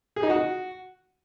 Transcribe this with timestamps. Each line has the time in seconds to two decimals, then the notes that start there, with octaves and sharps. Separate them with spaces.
0.16 G#4
0.23 D#4
0.30 F#4